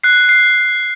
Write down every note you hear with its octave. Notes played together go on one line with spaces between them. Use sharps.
F#6 C7
C7